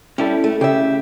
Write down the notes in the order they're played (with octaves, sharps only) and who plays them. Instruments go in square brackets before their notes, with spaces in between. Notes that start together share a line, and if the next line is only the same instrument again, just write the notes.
[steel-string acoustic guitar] G3 [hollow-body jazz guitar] C#4 E4 A4
[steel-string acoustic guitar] A3
[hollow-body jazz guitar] C#3 [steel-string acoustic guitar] G4 E5